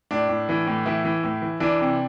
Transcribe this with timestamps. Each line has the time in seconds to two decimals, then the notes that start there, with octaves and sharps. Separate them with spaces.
0.11 A2 D4
0.29 A2
0.49 E3
0.67 A2
0.86 E3 E4
1.04 E3
1.24 A2
1.42 E3
1.60 E3 D4
1.80 C3